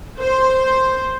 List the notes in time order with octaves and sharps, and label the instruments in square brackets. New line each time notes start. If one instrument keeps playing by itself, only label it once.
[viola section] C5